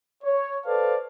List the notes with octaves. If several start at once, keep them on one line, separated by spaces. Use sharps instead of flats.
C#5
A4 B4 C5 D5 F5 A5